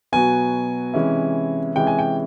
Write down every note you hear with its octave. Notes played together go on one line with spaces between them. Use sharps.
B2 F#3 B3 G#5
C3 E3 G#3 C#4 E4
C3 E3 G#3 C#4 E4 G5
G#5
G5